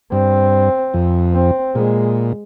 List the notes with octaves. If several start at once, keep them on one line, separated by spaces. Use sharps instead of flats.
G2 C4
F2
C4
A#2 G#3